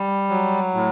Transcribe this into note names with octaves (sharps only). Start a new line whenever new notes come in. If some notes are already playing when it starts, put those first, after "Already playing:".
Already playing: G3
F#3
A2